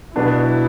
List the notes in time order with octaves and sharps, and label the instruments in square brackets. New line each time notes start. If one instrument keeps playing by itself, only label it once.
[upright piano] B2 B3 D4 [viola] E4